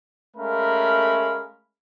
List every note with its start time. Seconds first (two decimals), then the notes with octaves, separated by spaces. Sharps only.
0.36 G#3 A3 C#4 A#4 F5 B5